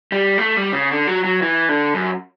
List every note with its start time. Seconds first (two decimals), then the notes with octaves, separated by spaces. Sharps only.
0.12 G3
0.38 A3
0.56 G3
0.73 C#3
0.91 D3
1.07 F#3
1.24 F#3
1.42 E3
1.69 D3
1.94 F#2